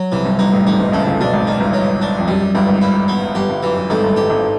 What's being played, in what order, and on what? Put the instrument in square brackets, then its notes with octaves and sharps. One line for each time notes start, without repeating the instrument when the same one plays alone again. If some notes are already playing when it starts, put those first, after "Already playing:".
Already playing: [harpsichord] F#3
[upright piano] C2 C3 [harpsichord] E3
[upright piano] G1 G2
[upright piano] G1 G2 [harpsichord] D#4
[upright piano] A1 A2
[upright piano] G#1 G#2 [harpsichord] D#4
[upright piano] G1 G2
[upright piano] C#2 C#3 [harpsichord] A3
[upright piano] C#2 C#3
[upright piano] B1 B2 [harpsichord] D4
[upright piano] G#1 G#2
[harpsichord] D#3
[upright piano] G1 G2
[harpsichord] F#3
D4
[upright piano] F2
[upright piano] F#2 [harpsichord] G3
[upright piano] F#2
[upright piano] G1 G2 [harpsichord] G3
[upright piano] G#1 G#2
[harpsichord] E4
B3
[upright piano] G1 G2 [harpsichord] G4
[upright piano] G1 G2
[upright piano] F#2 [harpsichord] E3
[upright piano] F#2
[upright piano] G#1 G#2 [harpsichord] A3
[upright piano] G1 G2
[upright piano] G1 G2 [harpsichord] G4
[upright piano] G#1 G#2